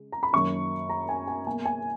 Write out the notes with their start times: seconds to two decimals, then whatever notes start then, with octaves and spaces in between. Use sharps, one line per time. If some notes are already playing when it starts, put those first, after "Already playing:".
Already playing: C#3 G#3
0.12 A#5
0.23 B5
0.33 F#2 D#3 F#3 A#3 C#6
0.89 A#5
1.09 G#5
1.28 G#5
1.47 B2 A#3 G#5
1.65 G#5